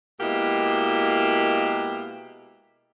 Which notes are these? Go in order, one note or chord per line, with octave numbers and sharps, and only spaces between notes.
B2 G#3 A#3 E4 G4